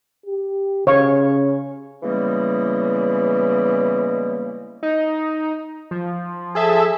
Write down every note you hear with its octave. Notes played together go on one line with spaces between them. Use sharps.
G4
C#3 C#5 F5 C#6
C#3 E3 G3 G#3 A#3 B3
D#4
F3
G#4 A4 E5